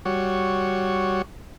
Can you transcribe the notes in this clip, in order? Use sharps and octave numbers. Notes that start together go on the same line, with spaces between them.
G3 F#4 C#5